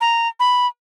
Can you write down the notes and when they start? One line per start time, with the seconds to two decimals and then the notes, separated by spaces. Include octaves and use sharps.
0.01 A#5
0.40 B5